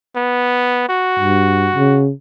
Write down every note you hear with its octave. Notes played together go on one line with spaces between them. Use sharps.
B3
F#4
G2
C#3